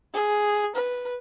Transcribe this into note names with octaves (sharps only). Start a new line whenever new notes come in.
G#4
B4